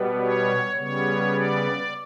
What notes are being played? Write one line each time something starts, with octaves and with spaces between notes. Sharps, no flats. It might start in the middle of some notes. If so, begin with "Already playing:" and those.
Already playing: B2 G3 B3
C#5
C#3 G3 B3 C#5
D5